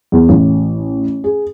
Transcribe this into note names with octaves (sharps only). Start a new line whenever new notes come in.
E2
A1
G#4